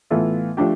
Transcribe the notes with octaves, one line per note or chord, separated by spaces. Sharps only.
A2 E3 B3 F4 A4
F3 A3 D4 G4